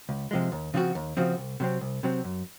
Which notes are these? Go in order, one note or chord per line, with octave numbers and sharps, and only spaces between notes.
C#2
C3 F3 G#3
D#2
C#3 F3 C4 F#4
D#2
C#3 F3 C4 F#4
C2
C3 F#3 C4
C2
C3 F#3 C4
F#2